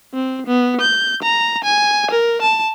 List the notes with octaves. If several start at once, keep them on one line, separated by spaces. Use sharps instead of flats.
C4
B3
G6
A#5
G#5
A#4
A5